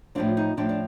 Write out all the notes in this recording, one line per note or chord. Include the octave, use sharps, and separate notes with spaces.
A2 F3 C4 D4 F4
D#4
A2 F3 C4 D4
D4